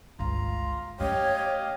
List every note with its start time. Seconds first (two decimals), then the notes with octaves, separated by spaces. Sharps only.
0.19 G1 C#2 F4 A#5
1.00 A3 C#4 G4 C#5 D#5 F5